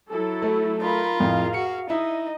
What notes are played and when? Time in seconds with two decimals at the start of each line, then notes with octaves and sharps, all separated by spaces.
0.10 F#3 E4 A4
0.42 A3
0.81 D#4 F4 A#4 B5
1.19 F2 A2 G#4 F5
1.54 F#4 C#7
1.90 D#4 E4 D#5